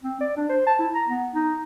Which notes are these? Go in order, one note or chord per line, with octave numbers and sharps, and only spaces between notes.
C4
D5
D4
C5
A5
E4
A#5
B3
D#4